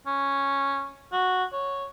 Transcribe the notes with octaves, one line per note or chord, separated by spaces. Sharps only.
C#4
F#4
C#5